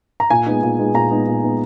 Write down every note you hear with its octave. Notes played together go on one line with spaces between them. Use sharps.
A#5
A#2 G#5
G#3 B3 D#4
A#2
G#3 B3 D#4
A#2 A#5
G#3 B3 D#4
A#2
G#3 B3 D#4